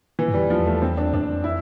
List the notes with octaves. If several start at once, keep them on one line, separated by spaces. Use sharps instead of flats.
E3
G2
F2 G3
E2 F3
A3
C4
D4
F2 D4
E4